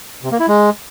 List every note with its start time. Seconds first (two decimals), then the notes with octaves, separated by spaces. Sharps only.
0.23 C3
0.31 A#3
0.40 E4
0.48 G#3